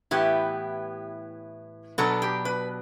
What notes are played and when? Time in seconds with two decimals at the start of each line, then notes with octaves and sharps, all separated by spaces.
0.11 A2 E3 B3 E4 G4
1.98 B2 F#3 B3 D4 A4
2.22 G4
2.45 B4